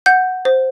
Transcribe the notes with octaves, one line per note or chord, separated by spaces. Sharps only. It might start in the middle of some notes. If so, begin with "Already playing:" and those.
F#5 G6
C5